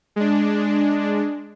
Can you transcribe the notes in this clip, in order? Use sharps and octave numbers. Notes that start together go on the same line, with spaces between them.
G#3 D4